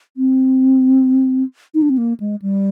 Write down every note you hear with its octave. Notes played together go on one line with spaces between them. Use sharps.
C4
D#4
D4
C4
A#3
G#3
G3